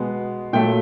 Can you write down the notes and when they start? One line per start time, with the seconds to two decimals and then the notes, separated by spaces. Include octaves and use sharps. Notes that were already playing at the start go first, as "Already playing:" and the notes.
Already playing: B2 G#3 B3
0.53 A#2 F#3 A3 G5